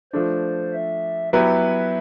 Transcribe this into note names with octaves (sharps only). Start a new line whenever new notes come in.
F3 A3 D4 C5
E5
F#3 B3 E4 G4 B4 E5